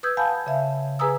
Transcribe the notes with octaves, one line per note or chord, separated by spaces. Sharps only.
B4 D#6 E6 G6 G#6
F5 F#5 G#5 A5 B5 G6
C#3 E5 F5
G#4 B4 G#5 A#5 D#6 E6